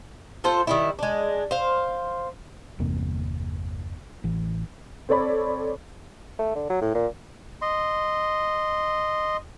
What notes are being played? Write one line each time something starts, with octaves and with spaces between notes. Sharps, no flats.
F4 A4 C5
D#3 G3 E4
G#3 D4
C5 F5
G1 E2 C3 A#3
A1 E3
C4 A4 C#5 D5 B5
A3
D3
F#3
A2
A#2
D#5 C6